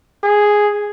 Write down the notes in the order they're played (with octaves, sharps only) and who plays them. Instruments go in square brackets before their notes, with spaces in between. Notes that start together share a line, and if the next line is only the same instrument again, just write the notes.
[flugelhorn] G#4